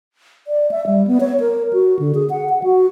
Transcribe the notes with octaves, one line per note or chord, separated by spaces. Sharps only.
D5
E5
G3
B3
C#5
A#4
F#4
D3
G#4
F#5
F#5
F#4